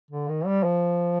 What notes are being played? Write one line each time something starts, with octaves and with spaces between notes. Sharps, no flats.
D3
D#3
G3
F3